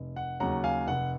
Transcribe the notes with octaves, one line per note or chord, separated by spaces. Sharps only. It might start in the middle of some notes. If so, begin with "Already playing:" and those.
Already playing: F1
F#5
D#2 C#3 F#3 C#4 F#5 A#5
F5 G#5
F1 F#5